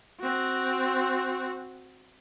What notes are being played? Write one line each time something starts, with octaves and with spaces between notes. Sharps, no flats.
C4 F#4